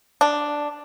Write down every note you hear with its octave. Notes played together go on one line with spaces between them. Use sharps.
D4